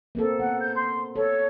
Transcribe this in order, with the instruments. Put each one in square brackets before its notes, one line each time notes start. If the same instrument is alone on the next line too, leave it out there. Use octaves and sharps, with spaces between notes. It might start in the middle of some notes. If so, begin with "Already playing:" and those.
[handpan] A#3 C4 A4
[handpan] B3 [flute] F#5
[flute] G6
C6
[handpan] A4 [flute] C#5